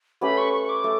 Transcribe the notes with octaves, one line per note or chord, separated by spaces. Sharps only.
A3 C#4 G4 B4 B5
C#6
C#6
C#6
D6
A3